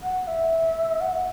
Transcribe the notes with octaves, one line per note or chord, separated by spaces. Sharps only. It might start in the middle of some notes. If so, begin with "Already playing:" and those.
F#5
E5
F#5